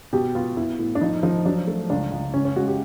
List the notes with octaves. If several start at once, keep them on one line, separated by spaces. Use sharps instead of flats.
B2 G4
B3 F4
B3 E4
A2
D4
F3 D#4
F3 D#4
F#3 D4
A3
C#2 D4
C#2
C#2 C#4
C#4
G#3 F#4
G4